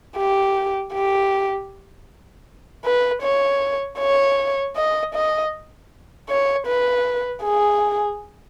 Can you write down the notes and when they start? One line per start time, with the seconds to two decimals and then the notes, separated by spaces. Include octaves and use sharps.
0.17 G4
0.93 G4
2.85 B4
3.22 C#5
3.99 C#5
4.76 D#5
5.14 D#5
6.29 C#5
6.67 B4
7.44 G#4